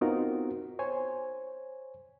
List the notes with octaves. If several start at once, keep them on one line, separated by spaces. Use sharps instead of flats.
B3 C4 D#4 F4 F#4 A#4
C5 C#5 G#5